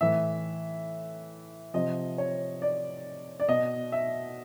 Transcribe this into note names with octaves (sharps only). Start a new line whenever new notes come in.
A2 E3 E5
C3 F3 D#5
C#5
D5
D5
B2 D#5
E5